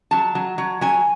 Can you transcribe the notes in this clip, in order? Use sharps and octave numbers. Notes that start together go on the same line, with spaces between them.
F#3 A5
F#3
F#3
F#3 G#5